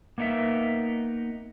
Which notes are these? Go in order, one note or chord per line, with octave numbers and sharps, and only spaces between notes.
A#3 B3 D#4 A#4 E5